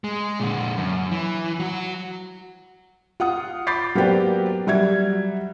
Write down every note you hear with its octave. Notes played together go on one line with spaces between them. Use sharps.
G#3
A#2 D3
F#2
E3
F#3 F#4
F4 F#5 D#6
B5 D6 G6 A6 B6 C7
F#3 A#3 B3 G4 C5 D5
F#3 G3 E5 G#6